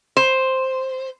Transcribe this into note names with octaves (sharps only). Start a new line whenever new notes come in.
C5